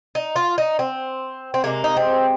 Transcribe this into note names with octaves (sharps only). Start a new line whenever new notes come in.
D#4
F4
D#4
C4
C4
C3 G#3 A#3
D#4
C4